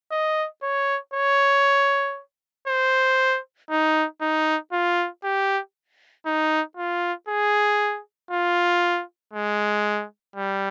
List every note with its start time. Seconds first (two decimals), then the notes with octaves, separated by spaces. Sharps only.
0.12 D#5
0.63 C#5
1.14 C#5
2.68 C5
3.70 D#4
4.21 D#4
4.73 F4
5.24 G4
6.26 D#4
6.77 F4
7.29 G#4
8.31 F4
9.34 G#3
10.36 G3